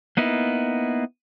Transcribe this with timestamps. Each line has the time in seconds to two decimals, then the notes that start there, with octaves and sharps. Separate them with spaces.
0.17 A#3 B3 D#4 E4